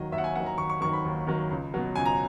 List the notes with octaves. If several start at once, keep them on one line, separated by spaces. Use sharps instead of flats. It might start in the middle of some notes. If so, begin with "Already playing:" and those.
Already playing: D#2 D#3 F#3 D#5
D#2 E5
F#5
G#5
D#3 F#3 F#5
A#5
D#2 C#6
C#6
D#3 F#3 C#6
B5
D#2
D#3 F#3
C#2
B2 F#3
C#2 G#5
A#5